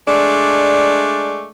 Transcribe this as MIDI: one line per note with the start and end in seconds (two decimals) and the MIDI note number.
0.07 1.47 56
0.07 1.47 57
0.07 1.47 62
0.07 1.47 74